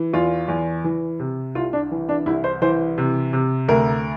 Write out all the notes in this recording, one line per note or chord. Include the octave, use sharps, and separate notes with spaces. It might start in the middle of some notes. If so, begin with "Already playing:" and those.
Already playing: E3
E2 F4
E2
E3
C3
C2 F4
D4
E3
D4
C2 E4
C5
E3 C5
C3
C3
D2 A#4